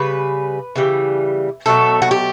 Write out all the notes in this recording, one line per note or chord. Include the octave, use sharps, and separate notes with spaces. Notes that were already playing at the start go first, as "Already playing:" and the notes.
Already playing: C#3 G3 B4
C#3 E3 G3
B2 F#3 A3 A4
F#4
G4